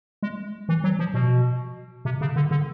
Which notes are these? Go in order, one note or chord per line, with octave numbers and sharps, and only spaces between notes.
G#3
E3
F#3
F3
B2
C3
C#3
D3
D3